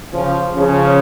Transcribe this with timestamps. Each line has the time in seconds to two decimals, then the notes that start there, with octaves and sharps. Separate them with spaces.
0.13 C#3 F3
0.56 C#3 F3